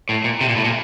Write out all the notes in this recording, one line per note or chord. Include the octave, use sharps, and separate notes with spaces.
A2
A#2
C3
A#2
A2
A#2